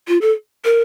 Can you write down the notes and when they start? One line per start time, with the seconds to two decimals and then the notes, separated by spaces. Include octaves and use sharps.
0.08 F4
0.22 A4
0.65 A#4